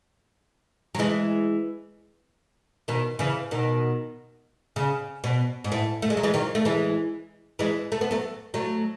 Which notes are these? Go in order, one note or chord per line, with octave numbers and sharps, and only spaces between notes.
F#3
E3 G#3
B2 D#3
C#3 E3
B2 D#3
C#3
B2
G#2
A2
A3
G#3
F#3
E3 G#3
D#3 F#3
A3
E3 G#3
E3 G#3
A3
B3
F#3 A3
F#3 A3